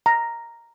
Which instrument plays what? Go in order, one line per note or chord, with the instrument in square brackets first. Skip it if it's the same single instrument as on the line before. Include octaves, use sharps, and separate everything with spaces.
[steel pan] A#5